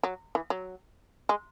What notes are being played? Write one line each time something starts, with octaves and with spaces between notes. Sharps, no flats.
F#3
E3
F#3
G#3